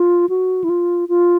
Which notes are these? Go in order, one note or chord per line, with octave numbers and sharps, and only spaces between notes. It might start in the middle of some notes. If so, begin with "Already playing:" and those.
Already playing: F4
F#4
E4
F4
F4